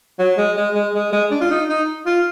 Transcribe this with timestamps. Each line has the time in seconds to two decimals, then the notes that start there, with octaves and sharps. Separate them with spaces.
0.19 F#3
0.38 G#3
0.57 G#3
0.75 G#3
0.95 G#3
1.13 G#3
1.31 D4
1.41 F4
1.51 D#4
1.69 D#4
2.06 F4